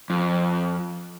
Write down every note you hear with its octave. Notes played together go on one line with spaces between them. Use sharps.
F2